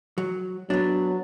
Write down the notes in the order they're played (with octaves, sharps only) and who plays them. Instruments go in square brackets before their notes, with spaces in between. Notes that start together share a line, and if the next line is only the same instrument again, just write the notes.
[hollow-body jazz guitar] F#3
[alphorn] F#3 [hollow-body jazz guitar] B3 D4